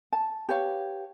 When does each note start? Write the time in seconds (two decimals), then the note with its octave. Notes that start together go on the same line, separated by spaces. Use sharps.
0.13 A5
0.49 G4 B4 C#5 F5